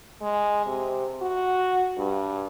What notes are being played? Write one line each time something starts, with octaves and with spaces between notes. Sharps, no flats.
G#3
C3
F#4
G2